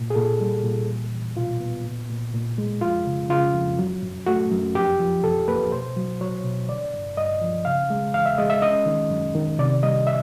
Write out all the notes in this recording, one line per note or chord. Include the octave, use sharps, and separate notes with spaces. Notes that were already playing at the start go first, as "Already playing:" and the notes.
Already playing: A#2
G#4
A#2 A4
G3
A#2
E2
E2
B2 F4
B3
A#2
A#2
A#2
G#3
F2 F4
C#3
C#3 F4
F2
F#3
F#2
A3 F#4
F#2
F2 G4
F3
F2 A4
A#3 B4
B2 C5
F#3
F#3 C#5
B2
D3 D5
G2
G2 D#5
F3
C#3 F5
G#3
E2 F5
E5
G#3 D#5
E5
C#4 D#5
D#3
F#2
D#3
C3 D5
G3 D#5
E5